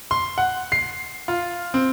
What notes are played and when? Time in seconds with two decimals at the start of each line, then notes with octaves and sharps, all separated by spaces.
0.11 C6
0.38 F#5
0.72 C7
1.28 F4
1.74 C4